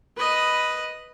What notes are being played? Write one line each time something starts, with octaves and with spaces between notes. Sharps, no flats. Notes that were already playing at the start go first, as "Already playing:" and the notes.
B4 D#5